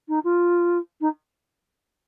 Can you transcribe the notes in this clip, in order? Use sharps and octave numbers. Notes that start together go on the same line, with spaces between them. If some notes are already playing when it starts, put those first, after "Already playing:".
D#4
F4
D#4